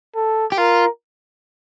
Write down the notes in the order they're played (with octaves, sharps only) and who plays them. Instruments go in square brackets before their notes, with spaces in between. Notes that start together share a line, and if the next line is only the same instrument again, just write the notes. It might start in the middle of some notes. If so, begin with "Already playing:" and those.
[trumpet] A4
[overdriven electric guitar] G4
[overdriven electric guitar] F4 [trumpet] A#4